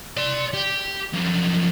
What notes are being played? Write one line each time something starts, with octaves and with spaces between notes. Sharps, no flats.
D5 C6
G4
F#2 F3